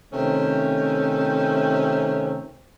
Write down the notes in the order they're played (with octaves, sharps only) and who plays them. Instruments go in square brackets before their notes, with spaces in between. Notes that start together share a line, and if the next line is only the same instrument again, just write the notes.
[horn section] C3 D#3 A3 C4 C#4